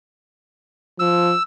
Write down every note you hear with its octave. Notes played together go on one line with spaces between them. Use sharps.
F3 E6